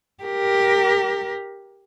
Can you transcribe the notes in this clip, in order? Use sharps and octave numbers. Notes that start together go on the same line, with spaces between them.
G4 A#4